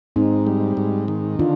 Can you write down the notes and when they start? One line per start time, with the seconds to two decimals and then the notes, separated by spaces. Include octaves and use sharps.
0.16 G#2 C4 D#4
0.47 G3
0.77 G#2
1.08 D#3
1.39 D3 D4 F4